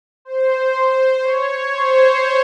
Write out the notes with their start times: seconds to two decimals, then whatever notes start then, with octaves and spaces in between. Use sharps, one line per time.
0.25 C5
1.23 C#5
1.72 C5